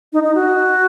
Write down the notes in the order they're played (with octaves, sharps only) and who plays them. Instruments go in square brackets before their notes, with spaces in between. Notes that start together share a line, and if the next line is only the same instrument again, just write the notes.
[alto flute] D#4
D#4
F#4